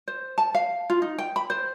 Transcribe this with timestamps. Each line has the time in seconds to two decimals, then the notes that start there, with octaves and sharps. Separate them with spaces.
0.08 C5
0.38 A5
0.55 F5
0.90 F4
1.02 D#4
1.19 G5
1.36 B5
1.50 C5